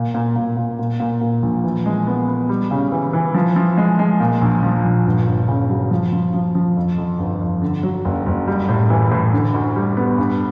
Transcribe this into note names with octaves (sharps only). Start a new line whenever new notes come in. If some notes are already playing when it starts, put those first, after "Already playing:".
Already playing: A#2
A#2
A#2
A#2
A#2
A#2
A#2
A#1
E3
G#3
B3
B3
G3
C#3
E3
E3
F3
F3
G#3
G#3
A#2
A#1
F3
A#1
G1
G1
C#3
F#3
F3
F3
F3
F3
F2
F2
G1
F2
D3
F#3
F#1
F#1
G3
A2
E3
A2
D3
D2
G3
B3
G2